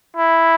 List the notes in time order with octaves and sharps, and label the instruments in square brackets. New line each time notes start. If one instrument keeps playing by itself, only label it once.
[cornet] E4